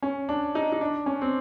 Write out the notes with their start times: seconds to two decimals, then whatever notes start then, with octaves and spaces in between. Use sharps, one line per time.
0.02 C#4
0.29 D4
0.55 D#4
0.72 D#4
0.81 D4
1.06 C#4
1.21 C4